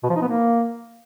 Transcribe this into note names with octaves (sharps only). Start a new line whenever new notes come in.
B2
F3
D#4
B3
A#3